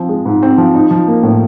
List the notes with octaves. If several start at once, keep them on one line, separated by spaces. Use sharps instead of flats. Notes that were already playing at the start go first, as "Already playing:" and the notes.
Already playing: F3 C4
G#3
G#2
C4
F3
D#4
F3
A#3
A2